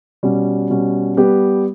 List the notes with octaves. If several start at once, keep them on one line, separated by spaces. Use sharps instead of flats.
B2 G3 C#4
B2 G3 C#4
G3 B3 G4 B4